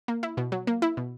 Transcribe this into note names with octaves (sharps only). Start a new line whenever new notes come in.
A#3
E4
B2
F#3
A#3
E4
B2